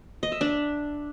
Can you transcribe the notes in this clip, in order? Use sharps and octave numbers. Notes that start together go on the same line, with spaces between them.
D#5
E5
D4